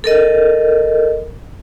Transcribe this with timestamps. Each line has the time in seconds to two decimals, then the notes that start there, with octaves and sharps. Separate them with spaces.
0.04 A4 A#4 D#5